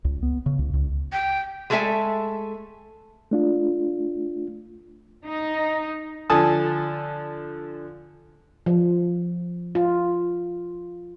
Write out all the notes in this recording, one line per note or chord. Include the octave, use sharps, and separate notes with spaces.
C#2
B3
C#3
C#2
C#2
G5
G#3 A3 G#4 A4 E5 G#5
A3 D4 F4
D#4
D3 F3 A4 G#5 A5 D#6
F3
F4